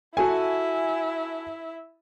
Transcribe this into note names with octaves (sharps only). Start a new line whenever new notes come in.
E4 F#4 A4 E5 G#5